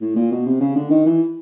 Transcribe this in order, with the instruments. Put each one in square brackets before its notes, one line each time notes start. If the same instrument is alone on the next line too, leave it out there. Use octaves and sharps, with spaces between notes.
[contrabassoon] A2
A#2
B2
C3
C#3
D3
D#3
E3